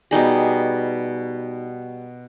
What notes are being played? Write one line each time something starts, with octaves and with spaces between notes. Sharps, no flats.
B2 G3 D#4 G#4